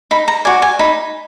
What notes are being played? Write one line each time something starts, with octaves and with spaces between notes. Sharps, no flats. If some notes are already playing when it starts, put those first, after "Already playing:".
D#4 B5
A#5
F#4 D5 G#5
G#5
D#4 B5